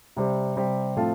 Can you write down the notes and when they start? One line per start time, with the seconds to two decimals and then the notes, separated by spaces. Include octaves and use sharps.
0.16 C3 G3 C4 G4
0.56 C3 G3 C4 G4
0.96 A2 F3 C4 F4 A4